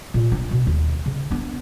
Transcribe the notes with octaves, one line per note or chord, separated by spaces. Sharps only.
A#2
D4
B2
D#2
C#3
B3 D4